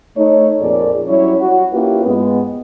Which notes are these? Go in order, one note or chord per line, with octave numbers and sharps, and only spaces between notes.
A3 D#4 C#5
F2 A#2 G#4 A#4 D5
F#3 G3 C#4 E4 C#5
F#4
A#3 C#4 E4 F4 G4 B4
G#2 G#3 B3